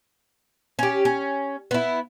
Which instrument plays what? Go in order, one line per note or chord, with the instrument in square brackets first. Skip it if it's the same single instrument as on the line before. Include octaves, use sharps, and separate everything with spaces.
[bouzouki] C#4 G4
C#4
B3 E4